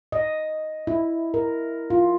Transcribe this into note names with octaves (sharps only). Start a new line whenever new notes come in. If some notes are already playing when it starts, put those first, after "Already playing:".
D#5
E4
A#4
F4